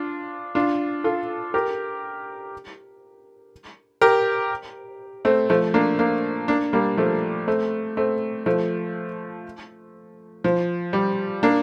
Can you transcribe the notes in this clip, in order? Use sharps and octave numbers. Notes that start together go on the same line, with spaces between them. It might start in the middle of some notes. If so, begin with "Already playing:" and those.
Already playing: D4 F4
D4 F4
F4 A4
G4 A#4
G4 A#4
A3 C4
F3 A3
A#3 D4
A#3 D4
A#3 D4
G3 A#3
F3 A3
A3 C4
A3 C4
F3 A3
F3
G3
A#3 D4